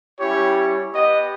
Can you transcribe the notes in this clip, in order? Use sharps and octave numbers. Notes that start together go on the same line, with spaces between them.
G3 C#4 E4 G4 C#5
B3 G4 D#5